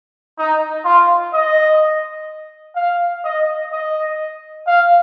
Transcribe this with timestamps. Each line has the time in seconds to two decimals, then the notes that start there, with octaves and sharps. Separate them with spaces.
0.39 D#4
0.85 F4
1.34 D#5
2.76 F5
3.24 D#5
3.72 D#5
4.67 F5